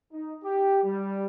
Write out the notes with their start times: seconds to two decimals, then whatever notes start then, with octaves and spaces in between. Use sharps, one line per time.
0.12 D#4
0.44 G4
0.83 G3